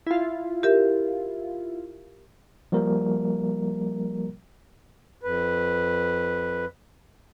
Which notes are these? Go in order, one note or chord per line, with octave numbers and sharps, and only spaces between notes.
E4 F4
G4 A#4 E5
F3 G3 A#3 A#4
F2 B4